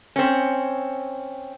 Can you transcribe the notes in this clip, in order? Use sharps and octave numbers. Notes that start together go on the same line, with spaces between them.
C4 C#4